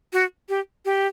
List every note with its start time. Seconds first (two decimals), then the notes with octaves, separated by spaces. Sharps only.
0.13 F#4
0.49 G4
0.85 G4